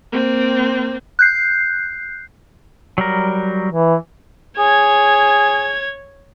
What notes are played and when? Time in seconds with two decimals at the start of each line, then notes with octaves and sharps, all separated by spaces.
0.12 A#3 C4
1.19 F#6 G6 C7
2.98 F#3 G3 A#4
3.71 E3
4.58 G#4 C#5 G#6